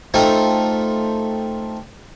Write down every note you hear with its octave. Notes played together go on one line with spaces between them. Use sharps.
A3 C4 D#4 F4 G5